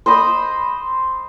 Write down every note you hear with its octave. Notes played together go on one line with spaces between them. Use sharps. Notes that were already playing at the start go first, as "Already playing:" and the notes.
C5 D#5 B5 D#6